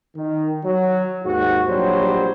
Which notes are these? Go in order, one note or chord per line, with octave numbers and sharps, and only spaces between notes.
D#3
F#3
D#2 G#2 F#4
A#1 F#3 G3 C5